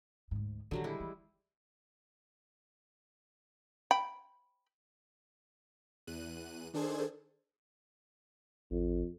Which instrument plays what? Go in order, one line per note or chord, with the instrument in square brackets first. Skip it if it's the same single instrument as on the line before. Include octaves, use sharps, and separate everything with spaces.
[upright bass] D2 G#2
[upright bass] A#2 D#3 [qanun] D3 F#3 G3
[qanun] G3 G#3 E4
[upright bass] E3
[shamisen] G5 B5
[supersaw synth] E2 F#6 D#7
D#3 D4 G#4 A4 C5 G#6
[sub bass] A1 [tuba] F2